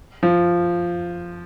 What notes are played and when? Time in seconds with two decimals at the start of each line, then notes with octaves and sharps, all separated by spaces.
0.23 F3